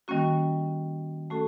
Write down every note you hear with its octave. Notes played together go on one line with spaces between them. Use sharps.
D#3 G3 A#3 C#4 F#4
A3 C#4 F#4 A4